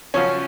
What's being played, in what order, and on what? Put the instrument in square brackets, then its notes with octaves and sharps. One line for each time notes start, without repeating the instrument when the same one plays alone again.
[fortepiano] F#2 C#3 F3 C#4